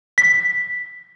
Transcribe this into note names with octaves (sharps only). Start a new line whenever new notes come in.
B6